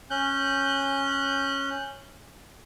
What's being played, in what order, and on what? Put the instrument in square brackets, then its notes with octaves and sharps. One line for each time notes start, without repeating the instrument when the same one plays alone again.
[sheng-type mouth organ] C#4 F#6 G6